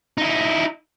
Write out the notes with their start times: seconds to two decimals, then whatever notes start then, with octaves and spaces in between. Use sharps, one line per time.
0.18 D#4 E4